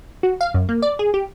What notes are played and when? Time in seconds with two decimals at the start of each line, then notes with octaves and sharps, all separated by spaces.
0.23 F#4
0.41 F5
0.54 F#2
0.69 A#3
0.82 D5
0.99 G#4
1.14 G4